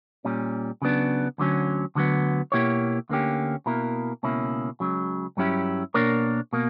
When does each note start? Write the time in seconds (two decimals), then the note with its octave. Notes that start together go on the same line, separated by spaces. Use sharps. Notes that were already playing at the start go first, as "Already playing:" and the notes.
0.25 A#2 G3 C#4
0.82 C#3 F#3 B3 D4
1.38 D2 D3 F#3 C#4
1.95 D2 D3 F#3 B3
2.52 B2 A#3 E4 G4 C#5
3.09 D2 D3 A#3 C#4 G4
3.66 B2 A#3 E4 A#4
4.23 C#2 B2 A#3 C#4 E4
4.80 C#2 C#3 F#3
5.37 G2 F#3 C#4 E4 G4
5.94 B2 A#3 D4 A#4 C#5
6.53 B2 A#3